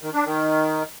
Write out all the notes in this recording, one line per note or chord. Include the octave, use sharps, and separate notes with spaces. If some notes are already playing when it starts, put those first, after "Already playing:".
D#3
D4
D#3